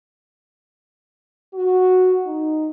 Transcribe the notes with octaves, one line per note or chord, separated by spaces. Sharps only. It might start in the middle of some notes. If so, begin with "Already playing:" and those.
F#4
D#4